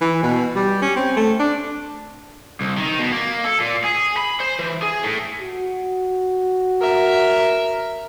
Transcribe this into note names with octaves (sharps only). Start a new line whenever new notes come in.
E3
B2
G3
C#4
C4
A3
D4
C2
D#3
B2
A#3
A4
A#2
G#4
B5
C5
E3
G#4
A2
F#4
A#4 E5